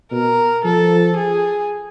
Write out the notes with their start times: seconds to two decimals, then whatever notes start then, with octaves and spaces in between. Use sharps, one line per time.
0.12 B2 A#4
0.65 F3 A4
1.16 G#4